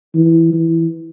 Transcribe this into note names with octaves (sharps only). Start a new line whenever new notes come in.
E3
E3